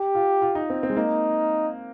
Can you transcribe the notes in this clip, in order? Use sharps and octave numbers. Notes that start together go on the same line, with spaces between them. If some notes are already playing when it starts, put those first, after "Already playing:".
Already playing: G4
F4
F4
D#4
C4
C4
G#3
A#3 D#4